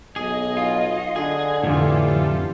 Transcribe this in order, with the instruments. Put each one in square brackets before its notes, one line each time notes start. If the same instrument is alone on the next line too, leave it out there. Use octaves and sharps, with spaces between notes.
[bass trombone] B1 [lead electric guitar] G#4 [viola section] D#5
[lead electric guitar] F4
[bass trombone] D3 [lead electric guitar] G#4
[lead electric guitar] C2 F2 [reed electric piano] A2 D3 [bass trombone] E3 [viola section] F4 G4 A4